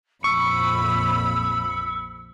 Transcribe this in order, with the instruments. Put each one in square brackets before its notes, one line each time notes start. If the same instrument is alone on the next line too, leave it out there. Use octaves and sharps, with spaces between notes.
[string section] A#1 F2 B5 [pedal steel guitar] C#6 [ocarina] E6